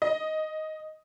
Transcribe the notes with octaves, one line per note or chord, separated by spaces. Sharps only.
D#5